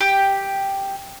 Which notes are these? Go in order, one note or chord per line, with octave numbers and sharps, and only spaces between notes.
G4